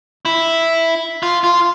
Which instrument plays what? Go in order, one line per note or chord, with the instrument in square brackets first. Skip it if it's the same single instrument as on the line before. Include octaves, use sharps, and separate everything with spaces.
[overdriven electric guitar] E4
F4
F4